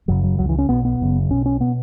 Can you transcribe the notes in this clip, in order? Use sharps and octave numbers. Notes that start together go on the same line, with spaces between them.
F#1 F#2 C#3 F#3
F#3
C#2 C#3 F#3
E3
C#4
B1 B2 B3
B3
F#1 F#2 C#3
B1 B2 C#4
C#4
B2 B3